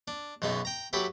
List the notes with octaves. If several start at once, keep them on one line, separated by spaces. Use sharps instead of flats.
D4
B1 F#2 G#3 B3 D#4
G5 A#5
F#3 E4 G4 A4 B4 E5